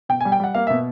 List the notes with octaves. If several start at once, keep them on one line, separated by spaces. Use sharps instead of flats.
B2 G5
G#5
G3
G5
G3 F#5
A#3 F5
E5
B2